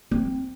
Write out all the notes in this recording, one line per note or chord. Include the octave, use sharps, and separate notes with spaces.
C4